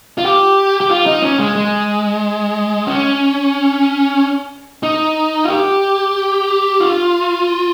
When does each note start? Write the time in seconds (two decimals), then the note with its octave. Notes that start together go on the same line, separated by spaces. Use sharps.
0.18 F4
0.25 G4
0.81 G4
0.90 F4
1.06 D#4
1.22 C#4
1.39 G#3
1.56 G#3
2.87 C#4
4.83 D#4
5.44 F4
5.50 G4
6.80 F4